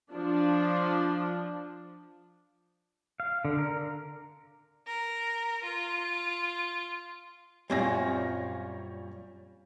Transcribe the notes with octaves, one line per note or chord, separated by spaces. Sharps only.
F3 D4
F5
D3
A#4
A#4
F4
F#2 A#2 G3 C4 C#5 A#6